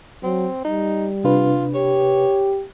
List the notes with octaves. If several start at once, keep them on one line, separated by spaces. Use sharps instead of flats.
F#3 C4
G3 D#4
C3 D4 F4 B4
G4 C#5